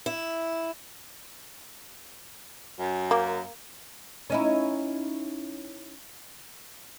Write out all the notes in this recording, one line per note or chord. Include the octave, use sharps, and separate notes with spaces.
E4
F#2
A#3
C#4 D#4 E4